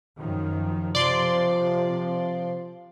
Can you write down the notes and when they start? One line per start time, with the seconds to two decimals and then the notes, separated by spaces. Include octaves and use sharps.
0.18 F#2 D#3 F3
0.95 C3 F3 D5 C6